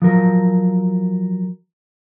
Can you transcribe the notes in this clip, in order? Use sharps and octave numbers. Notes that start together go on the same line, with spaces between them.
F3 F#3 A#4